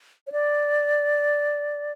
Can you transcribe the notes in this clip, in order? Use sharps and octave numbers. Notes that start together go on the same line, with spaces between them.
C#5
D5